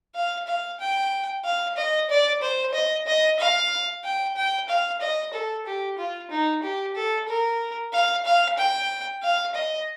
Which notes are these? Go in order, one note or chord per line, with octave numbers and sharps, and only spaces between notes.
F5
F5
G5
F5
D#5
D5
C5
D#5
D#5
F5
G5
G5
F5
D#5
A4
G4
F4
D#4
G4
A4
A#4
F5
F5
G5
F5
D#5